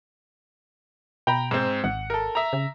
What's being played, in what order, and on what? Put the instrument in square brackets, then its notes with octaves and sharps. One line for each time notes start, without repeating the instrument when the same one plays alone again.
[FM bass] B2 [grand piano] G5 A#5 B5
[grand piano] G#2 C4
[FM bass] G#1 [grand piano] F#5
[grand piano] A4 A#4
E5 A#5
[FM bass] C#3